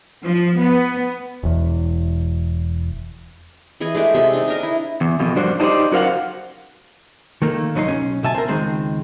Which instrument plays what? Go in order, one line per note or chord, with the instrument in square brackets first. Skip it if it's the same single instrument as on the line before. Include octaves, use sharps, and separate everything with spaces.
[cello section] F3
B3
[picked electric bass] E1 E2
[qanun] E3 G#4 D#5 G#5
G#3 A3 D4 G4
C3 G#4 E5
D4 D#4
D4 A#4 D#5
E4
[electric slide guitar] E2
F2 B2
G2 D4 F#4 C5
D4 D#4 G4 C5 D5
F#2 F#4 A#4 C5 F5 F#5
[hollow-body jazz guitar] D#3 A3 A#3
C2 F#3 D#4 A#5 C6
B1 G#2 C#4
B1 B2 E5 G#5 A5
C4 A#4
C#2 D#3 G#3 C4